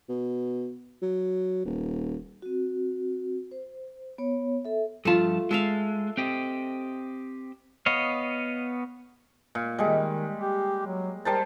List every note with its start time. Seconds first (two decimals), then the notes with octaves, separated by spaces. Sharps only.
0.09 B2
1.02 F#3
1.65 D#1
2.42 C4 F#4
3.51 C5
4.18 B3 C#5
4.65 A4 E5
5.05 G2 F3 A3 F4 A5
5.51 G#3 A4 E5 F5
6.17 C4 G4 D#5
7.86 B3 C#5 D#5 F5
9.55 A#2
9.79 D#3 G3 G#3
10.36 G4
10.86 F#3
11.25 G3 A#4 C5 A5